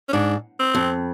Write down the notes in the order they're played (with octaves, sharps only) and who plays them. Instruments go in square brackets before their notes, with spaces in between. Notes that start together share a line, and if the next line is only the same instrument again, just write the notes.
[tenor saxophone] C#4
[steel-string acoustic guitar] G#2 [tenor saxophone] D4
[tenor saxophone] C4
[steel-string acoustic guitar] F2